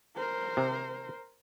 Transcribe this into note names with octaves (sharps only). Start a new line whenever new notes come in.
A#4 C5
C3